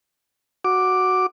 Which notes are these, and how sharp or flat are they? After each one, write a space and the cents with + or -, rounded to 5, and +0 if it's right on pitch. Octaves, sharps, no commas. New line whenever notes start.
F#4 +0 D6 +0